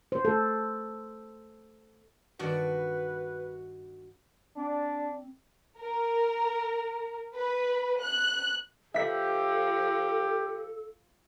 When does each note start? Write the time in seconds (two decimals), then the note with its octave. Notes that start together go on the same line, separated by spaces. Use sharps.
0.12 C5
0.25 A4
2.39 G2 D#3 F#4 B4 D5
4.57 C4 D4
5.78 A#4
7.36 B4
8.02 F#6
8.94 F3 G4 A4 E5 B6